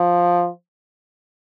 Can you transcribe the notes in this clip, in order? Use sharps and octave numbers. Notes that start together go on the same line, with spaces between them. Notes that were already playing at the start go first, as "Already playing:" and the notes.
Already playing: F3